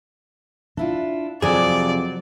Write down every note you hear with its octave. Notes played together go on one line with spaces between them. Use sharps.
D4 E4 F4
F2 C3 F#3 G#4 C5 D5